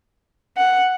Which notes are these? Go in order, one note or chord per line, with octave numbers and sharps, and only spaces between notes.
F#5